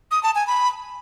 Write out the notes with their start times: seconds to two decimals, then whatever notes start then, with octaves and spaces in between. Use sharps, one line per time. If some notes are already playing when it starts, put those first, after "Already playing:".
0.11 D#6
0.23 A5
0.35 G#5
0.47 B5